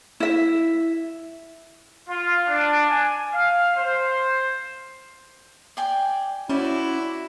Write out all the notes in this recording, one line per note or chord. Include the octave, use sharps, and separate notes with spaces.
E4 E5
F4
D4
G#5
F5
C5
D5 G5 G#5
C#4 E4 F#4 C5 D5